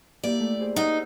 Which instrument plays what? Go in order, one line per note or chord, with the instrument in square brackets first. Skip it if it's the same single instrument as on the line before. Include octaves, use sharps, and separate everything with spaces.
[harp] A#3 E4 G4 [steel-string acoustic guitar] D5
[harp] A3
G#4 C5
[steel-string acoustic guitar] D#4 [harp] F#5 D#6 E6